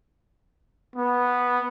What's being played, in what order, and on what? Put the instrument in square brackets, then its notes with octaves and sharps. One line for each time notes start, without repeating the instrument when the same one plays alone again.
[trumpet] B3